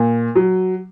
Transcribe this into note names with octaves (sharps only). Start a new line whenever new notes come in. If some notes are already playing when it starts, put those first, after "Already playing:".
Already playing: A#2
F#3